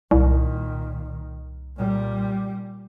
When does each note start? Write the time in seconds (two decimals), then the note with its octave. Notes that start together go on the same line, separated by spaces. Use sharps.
0.11 C2 A#2 D#3
1.77 A#2 G3